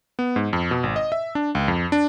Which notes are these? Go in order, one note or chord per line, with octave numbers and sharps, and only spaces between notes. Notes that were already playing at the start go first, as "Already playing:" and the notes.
B3
G#2
F2
B2
G#1
D#5
E5
D4
C#2
F2
D4